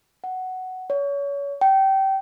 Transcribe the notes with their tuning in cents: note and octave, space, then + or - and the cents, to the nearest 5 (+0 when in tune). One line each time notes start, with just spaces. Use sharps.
F#5 +5
C#5 +30
G5 -20